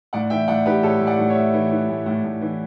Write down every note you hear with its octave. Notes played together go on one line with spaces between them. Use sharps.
A2 D5 F#5
E3 E5 G5
A2 D5 F#5
E3 G4 B4
A2 A4 C#5
A2
D5 F#5
A2
C#5 E5
A2
E3
E3
A2
A2
A2
E3